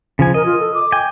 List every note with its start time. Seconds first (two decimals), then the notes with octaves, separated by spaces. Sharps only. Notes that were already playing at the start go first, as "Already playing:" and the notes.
0.19 C#3 F3 G#5
0.34 A#4 D#5
0.46 F4
0.60 A4
0.74 D6
0.92 G5 G#5